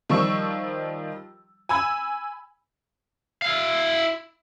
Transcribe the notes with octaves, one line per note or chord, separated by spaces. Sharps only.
D#3 F3 G3 C#6 E6
G#5 B5 E6 G#6
E4 F5